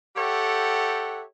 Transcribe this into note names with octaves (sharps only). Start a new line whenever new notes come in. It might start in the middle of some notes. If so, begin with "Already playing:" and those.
G4 A4 C#5 E5 F#5 G5